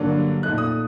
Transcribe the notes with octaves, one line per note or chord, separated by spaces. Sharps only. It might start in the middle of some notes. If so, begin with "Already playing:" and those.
Already playing: G2 D3 F#3 A#3 D4
A#2 A3 D#4 F#6
D#6